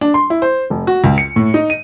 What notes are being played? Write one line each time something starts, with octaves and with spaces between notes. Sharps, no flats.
D4
C6
E4
C5
F1
F#4
C#2
C#7
A2
D#4
D#7